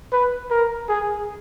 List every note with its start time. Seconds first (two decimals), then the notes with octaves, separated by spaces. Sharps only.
0.12 B4
0.51 A#4
0.89 G#4